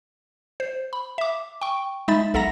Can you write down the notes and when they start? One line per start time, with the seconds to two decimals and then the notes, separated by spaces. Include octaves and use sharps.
0.60 C5
0.93 B5
1.18 E5 D6
1.61 G5 C#6
2.08 G#3 D#4 E5 B5 A6
2.34 B1 A4 E5 F#5 A#5 A#6